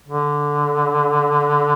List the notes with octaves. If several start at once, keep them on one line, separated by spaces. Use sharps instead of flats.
D3